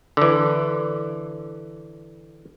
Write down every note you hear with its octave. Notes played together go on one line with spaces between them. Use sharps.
D3 E3